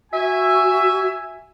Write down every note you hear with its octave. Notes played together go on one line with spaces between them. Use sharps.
F#4 E5 G#5